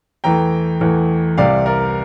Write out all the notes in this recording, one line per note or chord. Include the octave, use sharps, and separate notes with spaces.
E2 E3 A3 G5 A#5
E2 E3 A3
C2 C3 G3 D5 F5
A#4 D5